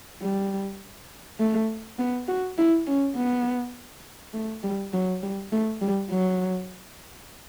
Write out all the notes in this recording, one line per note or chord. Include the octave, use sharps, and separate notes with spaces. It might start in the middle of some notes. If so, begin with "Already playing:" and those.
G3
A3
B3
F#4
E4
C#4
B3
A3
G3
F#3
G3
A3
G3
F#3